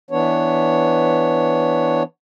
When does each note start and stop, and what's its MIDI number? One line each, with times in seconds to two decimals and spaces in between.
0.11 2.03 52
0.11 2.03 59
0.11 2.03 62
0.11 2.03 73